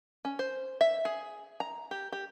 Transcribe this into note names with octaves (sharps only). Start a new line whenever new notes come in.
C#4
C5
E5
G#4
A#5
G4
G4